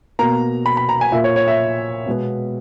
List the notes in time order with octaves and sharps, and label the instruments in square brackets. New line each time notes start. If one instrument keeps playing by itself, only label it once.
[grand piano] B2 A#3 A#5
B5
B5
A#5
G#5
A#2 E5
A#3
C#5
C#5
E5
B2 G#3 B3